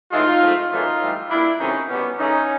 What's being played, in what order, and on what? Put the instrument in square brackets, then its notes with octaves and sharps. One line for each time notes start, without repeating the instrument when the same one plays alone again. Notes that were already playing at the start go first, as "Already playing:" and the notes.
[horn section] A2 E3 G#3 D#4 F4
G#2 F3 A3
F#2 C#3 E3 A3 D#4 F4
A2 E3 G3
A#2 G3 D4 E4
C3 D#3 F#3 A3 C#4 D#4
B2 G3 B3 C#4
C#3 E3 A3 C#4 D#4